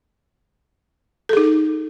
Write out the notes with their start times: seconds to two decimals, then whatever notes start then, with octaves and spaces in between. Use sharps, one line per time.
1.29 A4
1.33 G#4
1.37 D#4